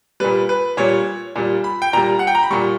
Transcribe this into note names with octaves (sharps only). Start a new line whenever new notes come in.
A#2 G3 B4
B4
A#2 G3 C#5
A#2 G3
B5
G5
A#2 G3 A#5
F#5
G5
A#5
B5
A#2 G3 C#6